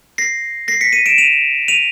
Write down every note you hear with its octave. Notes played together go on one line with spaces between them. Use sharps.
A#6 C7
A#6 C7
B6 C#7
C#7 D#7
D7 E7
D#7 F7
D#7 F7